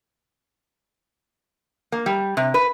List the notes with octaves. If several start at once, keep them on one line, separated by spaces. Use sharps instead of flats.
A#3
G3
C3
B4